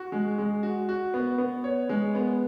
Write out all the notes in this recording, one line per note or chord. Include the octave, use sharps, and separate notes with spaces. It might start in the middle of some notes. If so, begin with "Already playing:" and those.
Already playing: F#4
G#3
G#3
F#4
F#4
B3
B3
C#5
G#3
B3